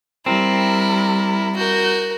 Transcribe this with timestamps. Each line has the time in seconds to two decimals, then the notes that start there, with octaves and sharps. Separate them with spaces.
0.26 G3 C4 E4 A#4
1.56 F#4 A#4 G6